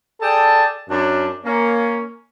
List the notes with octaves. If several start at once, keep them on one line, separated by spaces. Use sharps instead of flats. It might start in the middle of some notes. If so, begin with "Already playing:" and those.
G#4 A4 D5 G5 A5
F#2 D4
A#3 C#4